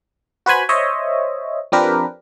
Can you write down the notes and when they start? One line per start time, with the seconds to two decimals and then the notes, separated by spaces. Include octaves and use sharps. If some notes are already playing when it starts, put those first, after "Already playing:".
0.46 F#4 B4 C5 G#5 B5
0.69 C5 C#5 D#5 E5
1.72 F3 C4 D4 G4 A#4 B4